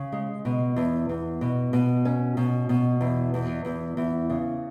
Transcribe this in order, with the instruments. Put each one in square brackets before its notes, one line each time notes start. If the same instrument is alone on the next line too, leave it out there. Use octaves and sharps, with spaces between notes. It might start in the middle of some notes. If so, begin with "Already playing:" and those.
Already playing: [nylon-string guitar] C#3
G#3
B2
E2
E2
B2
B2
C#4
B2
B2
E2
E2
E2
E2
C#3